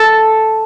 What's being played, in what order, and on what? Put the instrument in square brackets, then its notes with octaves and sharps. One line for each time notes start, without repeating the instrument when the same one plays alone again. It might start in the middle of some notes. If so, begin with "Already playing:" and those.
Already playing: [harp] A4 A5